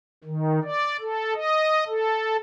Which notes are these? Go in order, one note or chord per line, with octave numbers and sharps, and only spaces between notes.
D#3
D5
A4
D#5
A4